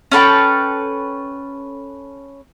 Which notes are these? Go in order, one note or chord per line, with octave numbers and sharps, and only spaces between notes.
C#4 A4 B4 G5